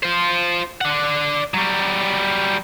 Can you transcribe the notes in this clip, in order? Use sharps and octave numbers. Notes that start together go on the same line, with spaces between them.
F4 C5
D4 F#5
F#3 G3